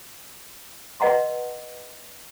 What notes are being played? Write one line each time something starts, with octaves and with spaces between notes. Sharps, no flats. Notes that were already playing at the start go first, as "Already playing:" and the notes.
B4 D#5 F#5 A#5 C6